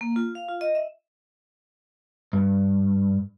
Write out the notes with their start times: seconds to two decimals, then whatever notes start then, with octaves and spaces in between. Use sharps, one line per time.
0.01 A#3
0.16 F4
0.35 F5
0.48 F4
0.61 D#5
0.75 E5
2.33 G2